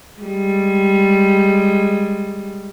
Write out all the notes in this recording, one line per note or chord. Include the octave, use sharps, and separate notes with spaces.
G3 G#3